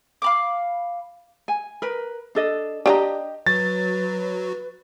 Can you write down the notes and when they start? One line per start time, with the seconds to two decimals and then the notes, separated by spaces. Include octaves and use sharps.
0.22 F5 B5 D6
1.48 G#5
1.82 A#4 B4
2.35 D4 A4 D#5
2.86 D4 G4 D#5 E5 A#5
3.47 F#3 B4 A6